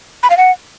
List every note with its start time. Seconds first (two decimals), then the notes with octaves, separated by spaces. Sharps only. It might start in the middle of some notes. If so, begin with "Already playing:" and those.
0.23 B5
0.30 F5
0.37 F#5